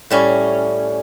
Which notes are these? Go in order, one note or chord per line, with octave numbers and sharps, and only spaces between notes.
A2 G3 C#4